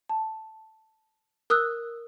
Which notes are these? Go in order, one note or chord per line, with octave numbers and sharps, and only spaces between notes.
A5
A#4 D#6 E6 F#6